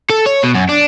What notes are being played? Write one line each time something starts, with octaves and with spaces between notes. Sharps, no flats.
A4
C#5
B2
F#2
D4